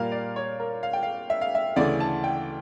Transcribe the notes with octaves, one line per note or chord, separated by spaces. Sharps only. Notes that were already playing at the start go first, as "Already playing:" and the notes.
Already playing: A#2 G3 A#3 F5
D5
C#5
A#4
F5
G5
F5
E5
F5
E5
D2 C#3 E3 A3 D5
A5
G5